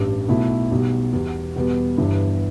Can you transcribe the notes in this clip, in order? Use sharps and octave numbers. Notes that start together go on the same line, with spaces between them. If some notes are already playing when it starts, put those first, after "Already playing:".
Already playing: A1 G2 G3
B1 B2 A3 E4
B1 B2 G3
E2 B2 G3
E2 B2 G3 B3
G1 G2 E3